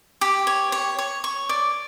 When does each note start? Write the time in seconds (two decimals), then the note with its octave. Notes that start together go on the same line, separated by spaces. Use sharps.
0.21 G4
0.47 C#5
0.72 C#5
0.99 C#5
1.24 C#6
1.49 D5